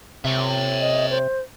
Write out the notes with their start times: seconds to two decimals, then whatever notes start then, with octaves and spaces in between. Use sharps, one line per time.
0.25 C3 C#5 E5
0.81 D#5
1.11 C5